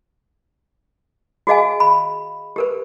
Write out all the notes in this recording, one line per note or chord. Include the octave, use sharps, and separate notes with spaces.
F#4 G#4 D#5 F5 G#5
B5
G4 A#4 B4